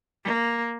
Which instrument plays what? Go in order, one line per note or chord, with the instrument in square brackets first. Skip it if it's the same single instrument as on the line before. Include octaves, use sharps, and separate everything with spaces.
[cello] A#3